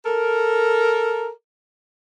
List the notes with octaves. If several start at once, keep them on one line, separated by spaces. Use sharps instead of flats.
A4 A#4